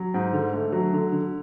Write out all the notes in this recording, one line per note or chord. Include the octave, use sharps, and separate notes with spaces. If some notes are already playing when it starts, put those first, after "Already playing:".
Already playing: F#3
G#2
D3
A3
F#3
D3
D3